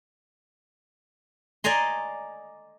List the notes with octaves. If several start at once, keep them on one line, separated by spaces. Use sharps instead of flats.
D5 D#5 G#5 A#5 C6